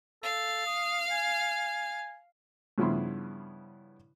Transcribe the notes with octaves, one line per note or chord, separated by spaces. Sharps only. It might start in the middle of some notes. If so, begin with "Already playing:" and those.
A4 F5
D#6
G#5
G2 C#3 F3 B3 E4 C6